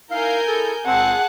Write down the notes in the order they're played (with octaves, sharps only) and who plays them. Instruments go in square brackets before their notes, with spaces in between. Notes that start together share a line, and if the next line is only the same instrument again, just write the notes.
[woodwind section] D#4 E4 F5 [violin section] A#4 G#5 G6
[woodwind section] E4 G#4 A4
[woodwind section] C#2 A#2 C4 [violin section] G#4 A5 F#6 [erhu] F#5